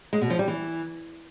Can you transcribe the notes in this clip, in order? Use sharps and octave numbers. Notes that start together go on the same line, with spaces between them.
G#3
B2
F3
G3
E3